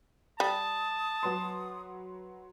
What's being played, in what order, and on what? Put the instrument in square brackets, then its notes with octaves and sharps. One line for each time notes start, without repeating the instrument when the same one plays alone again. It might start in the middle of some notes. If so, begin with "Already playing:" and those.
[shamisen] G3 [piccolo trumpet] A5 [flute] D#6
[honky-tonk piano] F#3 B4 C6